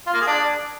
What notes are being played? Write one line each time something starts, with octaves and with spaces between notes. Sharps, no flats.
F4
A#3
G#4
D4